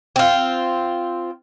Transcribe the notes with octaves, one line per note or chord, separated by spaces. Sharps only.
C4 F4